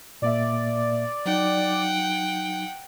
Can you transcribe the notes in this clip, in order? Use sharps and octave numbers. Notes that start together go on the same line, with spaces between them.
A#2 A#3 D5 E5
F#3 D#4 F#5 G5